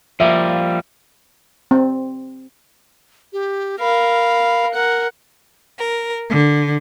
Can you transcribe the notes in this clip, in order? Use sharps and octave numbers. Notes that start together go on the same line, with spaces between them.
F3 G3 A#3 E5
C4
G4
A#4 F5 B5
A#4 F#5
A#4
D3